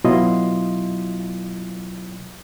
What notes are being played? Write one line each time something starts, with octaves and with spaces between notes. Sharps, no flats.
B2 F#3 E4 F4 D#5 C6